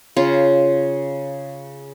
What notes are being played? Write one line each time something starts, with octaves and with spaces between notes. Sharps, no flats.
C#3 F4